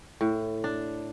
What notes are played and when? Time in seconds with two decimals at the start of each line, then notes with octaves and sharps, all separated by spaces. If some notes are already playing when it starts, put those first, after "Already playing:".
0.21 A2
0.64 D4